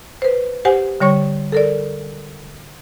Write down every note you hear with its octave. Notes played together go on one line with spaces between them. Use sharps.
B4 C5
G4 C5 F#5 G#5
D3 G3 C#5 C#6
A4 A#4 D5